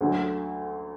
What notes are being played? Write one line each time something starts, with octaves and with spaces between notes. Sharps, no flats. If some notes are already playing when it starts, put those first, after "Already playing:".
D2 D3 F#3